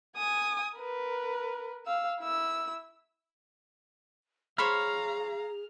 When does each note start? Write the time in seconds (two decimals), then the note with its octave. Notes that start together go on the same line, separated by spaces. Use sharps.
0.17 G#5 D#6
0.75 A#4 B4
1.86 F5 E6
2.20 E4 E6
4.58 G#4 C5 C#5 F5 A#5 B5 F6